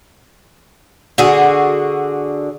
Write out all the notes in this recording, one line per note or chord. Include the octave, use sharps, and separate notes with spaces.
D3 F#4 G#4